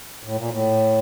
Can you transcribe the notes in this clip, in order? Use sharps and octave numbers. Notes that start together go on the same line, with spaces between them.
A2
A#2
A2